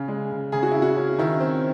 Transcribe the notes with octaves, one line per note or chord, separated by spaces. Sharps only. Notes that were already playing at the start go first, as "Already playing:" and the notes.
Already playing: C#3
G#3
C#3
C#3 G#4
F#4
C#3 E4
F#4
C#4
D#3 E4
C4